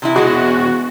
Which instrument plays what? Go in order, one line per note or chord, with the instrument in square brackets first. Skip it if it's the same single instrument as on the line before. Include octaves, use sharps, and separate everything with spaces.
[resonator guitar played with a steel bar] C3 E3 E4
[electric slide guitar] E2 B2 E3 [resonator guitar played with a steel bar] G#3 B3 [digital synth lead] F#4